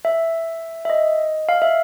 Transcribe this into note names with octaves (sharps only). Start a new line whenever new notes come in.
E5
E5
D#5
F5
E5